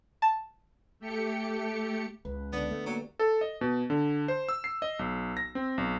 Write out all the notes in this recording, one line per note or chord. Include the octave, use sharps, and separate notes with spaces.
A5
A3 G4 C#7
C#2 B4
D3 B3 D4
A3
F#3 A#3 B3 D4 D#4 G4
A4
D#5
B2
D3
C5
E6
C7
D#5
B1
A#6
C4
B1